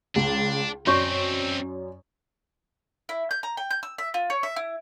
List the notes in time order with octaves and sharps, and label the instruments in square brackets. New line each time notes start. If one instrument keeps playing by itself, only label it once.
[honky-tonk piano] C#2 [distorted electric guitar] D4
[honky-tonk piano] F#2 D5 [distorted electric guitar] C4 D#4 [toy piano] F#4 C#5 C#6
[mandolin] E4
G6
A#5
G5
G6
E6
E5
F4
C#5
E5
E4